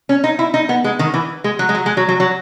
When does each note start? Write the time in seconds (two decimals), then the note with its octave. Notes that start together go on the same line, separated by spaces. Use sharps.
0.09 C#4
0.24 D#4
0.39 E4
0.54 D#4
0.69 B3
0.84 G#3
0.99 D#3
1.14 E3
1.44 G#3
1.59 F#3
1.69 G#3
1.75 F#3
1.86 G#3
1.97 F#3
2.09 F#3
2.20 F#3